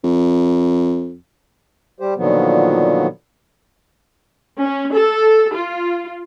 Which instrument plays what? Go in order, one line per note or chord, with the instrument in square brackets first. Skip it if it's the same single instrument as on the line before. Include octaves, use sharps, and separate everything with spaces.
[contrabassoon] F2
[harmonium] G3 G4 C5
A#2 D3 D#3 F3 F#3 B3
[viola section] C#4
A4
F4